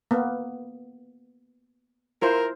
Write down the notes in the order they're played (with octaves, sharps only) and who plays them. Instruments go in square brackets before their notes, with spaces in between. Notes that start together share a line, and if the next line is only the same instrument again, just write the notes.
[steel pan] A#3 B3
[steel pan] E4 F4 C5 [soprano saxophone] A#4